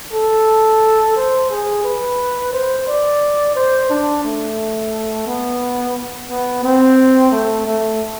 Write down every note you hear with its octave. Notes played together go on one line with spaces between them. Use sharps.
A4
C5
G#4
B4
C5
D5
C5
D4
A3
B3
B3
C4
A3
A3